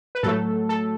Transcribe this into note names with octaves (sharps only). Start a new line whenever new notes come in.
B4
A2 F#3 A3 A4
A4